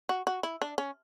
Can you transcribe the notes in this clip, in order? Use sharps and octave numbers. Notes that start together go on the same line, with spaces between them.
F#4
F#4
E4
D4
C#4